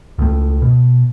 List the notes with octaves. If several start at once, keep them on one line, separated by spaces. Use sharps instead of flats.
C#2 A3
B2